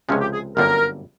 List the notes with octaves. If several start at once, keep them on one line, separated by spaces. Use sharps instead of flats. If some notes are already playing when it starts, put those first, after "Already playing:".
C#2 C3 F3 G#3 C#4
G4
G#4
G1 F#2 D3 G3 A#3 A#4